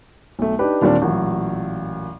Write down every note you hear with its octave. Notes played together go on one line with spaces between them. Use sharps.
B1 A3
D4 D#4 G4 B4
D#2 A#2 G3 C4 D4
A1 A#2 F#3